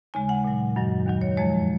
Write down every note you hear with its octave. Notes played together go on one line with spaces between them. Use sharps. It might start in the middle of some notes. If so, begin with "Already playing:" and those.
D#2 C#3 G#3 G#5
F#5
A#2 F#3
F#2 D#3 F#3
D#2 D#3 F#3
C#5
F2 F3 G#3 C#5